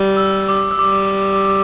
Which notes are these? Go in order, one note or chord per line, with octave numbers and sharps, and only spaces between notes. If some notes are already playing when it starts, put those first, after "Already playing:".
Already playing: G3
E6
D6
E6
G3 D6